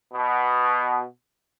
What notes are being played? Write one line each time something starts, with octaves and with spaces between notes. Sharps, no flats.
B2